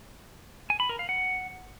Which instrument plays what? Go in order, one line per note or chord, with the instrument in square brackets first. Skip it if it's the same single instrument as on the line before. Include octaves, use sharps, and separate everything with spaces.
[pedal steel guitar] G#5
B5
A#4
F5
F#5